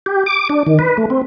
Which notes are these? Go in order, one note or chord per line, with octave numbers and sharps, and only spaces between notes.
G4
D6
D4
D#3
B4
A3
C4